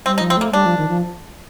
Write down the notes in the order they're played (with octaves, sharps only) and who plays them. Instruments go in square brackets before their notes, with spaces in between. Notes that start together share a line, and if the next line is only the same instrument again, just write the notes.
[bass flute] G3 [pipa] C4
[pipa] D#4
[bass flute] F3
[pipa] C4
[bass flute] A3 [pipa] A#3
[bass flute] G3 [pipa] D4
[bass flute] F3
D#3
F3